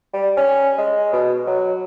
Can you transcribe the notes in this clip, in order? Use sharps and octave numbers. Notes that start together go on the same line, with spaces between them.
G3
C#4
G#3
B2
F#3